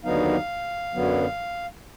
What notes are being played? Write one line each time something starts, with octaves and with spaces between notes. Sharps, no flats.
D#2 D3 F#3 B3 D#4 F5
F#2 D3 F#3 B3